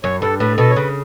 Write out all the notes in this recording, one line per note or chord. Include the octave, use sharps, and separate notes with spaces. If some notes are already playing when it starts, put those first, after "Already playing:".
F#2 C#5
G2 A4
A2 B4
B2 A4
C#5
C#3 B4